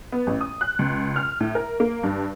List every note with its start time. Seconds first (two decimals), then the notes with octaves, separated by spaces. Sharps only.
0.12 B3
0.27 A1
0.41 D#6
0.61 F#6
0.79 C#2
1.16 F6
1.40 A2
1.55 A#4
1.80 A#3
2.03 G2